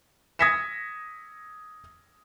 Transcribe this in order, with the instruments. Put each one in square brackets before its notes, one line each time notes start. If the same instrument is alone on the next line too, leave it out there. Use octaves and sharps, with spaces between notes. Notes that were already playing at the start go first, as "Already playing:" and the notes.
[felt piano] D#6 G#6 A#6 B6 C#7 E7